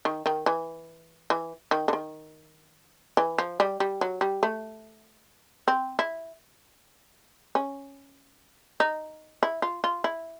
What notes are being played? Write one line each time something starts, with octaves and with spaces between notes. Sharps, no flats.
D#3
D#3
E3
E3
D#3
D3
D#3
E3
F3
G3
G3
F#3
G3
A3
C4
E4
C#4
D#4
E4
F4
F4
E4